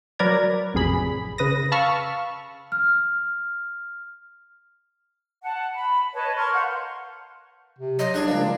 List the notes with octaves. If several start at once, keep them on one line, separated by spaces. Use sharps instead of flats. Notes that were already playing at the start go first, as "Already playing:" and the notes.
F#3 A#4 B4 D5 A#5 G#6
A1 F2 C3 G#4 B5
C#3 B4 D#6 A#6
F5 A5 B5 C#6 E6 F6
F6
F#5 A5
B5
B4 C#5 D#5 A5
A#4 C6 C#6 F6
F5 F#5 C6 G6
C3
F#3 D#5 C6
C2 D4 G#4 F#5
C#2 F3 A#3